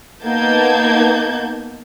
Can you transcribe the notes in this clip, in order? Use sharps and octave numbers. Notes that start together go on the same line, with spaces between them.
A#3 B3 D#4 A5 G6 G#6